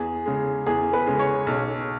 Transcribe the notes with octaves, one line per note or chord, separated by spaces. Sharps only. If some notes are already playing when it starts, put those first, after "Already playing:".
Already playing: E2 G#4
C#3 G#3
E2 G#4
B4
C#3 G#3
C#5
B1